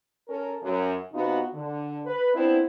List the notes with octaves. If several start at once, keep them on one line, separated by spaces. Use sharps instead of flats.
C#4 A4 A#4
F#2
C3 B3 D#4 F4 F#4
D3
B4
B3 C4 D4 E4